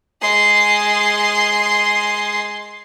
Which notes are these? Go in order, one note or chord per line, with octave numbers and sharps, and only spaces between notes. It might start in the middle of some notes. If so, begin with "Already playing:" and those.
G#3 C6